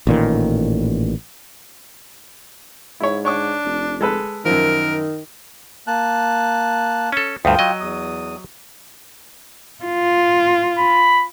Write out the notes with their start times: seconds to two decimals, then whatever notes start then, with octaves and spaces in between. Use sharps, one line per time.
0.07 A1 A#2 D#3
3.00 G#2 E4 C#5
3.25 D4 C#5 C#6 D6
3.65 F1
4.01 G#3 A4 B4
4.45 F#2 D#3 F3 A#4
5.87 A#3 A5 F#6
7.12 C#4 A4
7.45 D2 G2 F4 G5 D#6
7.59 F#3 D#5
7.80 E2 D#6
9.85 F4
10.78 B5